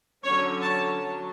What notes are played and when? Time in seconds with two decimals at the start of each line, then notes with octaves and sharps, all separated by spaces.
0.24 D3 F#3 C#4 C#5
0.62 A5
1.00 F#3